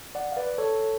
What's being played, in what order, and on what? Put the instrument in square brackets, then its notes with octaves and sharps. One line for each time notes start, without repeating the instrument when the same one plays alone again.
[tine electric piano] D5 F#5
F5
B4 D5
A4 C#5